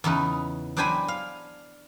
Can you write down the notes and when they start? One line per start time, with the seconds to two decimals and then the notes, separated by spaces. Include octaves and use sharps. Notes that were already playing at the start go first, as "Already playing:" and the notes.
0.04 E2 C#3 D#4 B4
0.77 F#3 D4 C5 G5 G#5 B5
1.08 F5